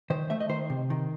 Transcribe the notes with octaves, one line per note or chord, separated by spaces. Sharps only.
D#3 C5
A3 E5
D#5
D#3 C5
C3
D#3